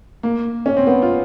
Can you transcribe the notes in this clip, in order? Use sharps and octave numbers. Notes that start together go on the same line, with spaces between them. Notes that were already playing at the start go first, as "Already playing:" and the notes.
A#3
C#4
C4
B3
F4